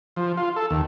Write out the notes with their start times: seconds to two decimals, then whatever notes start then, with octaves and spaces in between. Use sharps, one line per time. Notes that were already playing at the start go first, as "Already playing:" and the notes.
0.16 F3
0.37 F4
0.56 A4
0.70 D#2